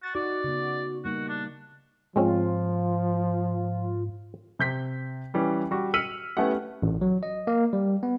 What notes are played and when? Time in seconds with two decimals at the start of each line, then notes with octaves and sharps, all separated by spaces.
0.03 F#4 A6
0.15 D#4 F#4 D5
0.44 C#3 B3
1.05 G3 A#3 D#4 F#4
1.29 D4
2.16 G#2 F3 G#3 C4 C#4 F4
4.59 C3 G6 B6
5.34 E3 G3 C#4
5.71 G3 F#4
5.94 E6 F6 B6 C#7 D#7 F#7
6.37 A3 B3 C#4 E4 G4 F#5
6.82 A1
7.01 F#3
7.23 D#5
7.47 A#3
7.73 G3
8.03 B3